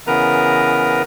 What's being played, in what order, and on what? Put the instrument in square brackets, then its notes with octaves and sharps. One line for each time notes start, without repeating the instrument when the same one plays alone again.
[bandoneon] C#3 E3 B3 A#4 B4 A#5